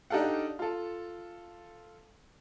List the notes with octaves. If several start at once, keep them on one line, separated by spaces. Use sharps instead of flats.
D4 D#4 G4 A4 F5 F#5
F4 A4